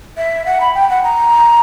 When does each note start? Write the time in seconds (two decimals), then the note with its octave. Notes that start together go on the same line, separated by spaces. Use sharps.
0.17 E5
0.46 F#5
0.61 B5
0.75 G5
0.90 F#5
1.04 A#5